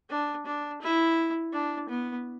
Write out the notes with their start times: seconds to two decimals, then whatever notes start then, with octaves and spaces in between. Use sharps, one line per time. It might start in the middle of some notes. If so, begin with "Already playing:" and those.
0.10 D4
0.46 D4
0.82 E4
1.53 D4
1.89 B3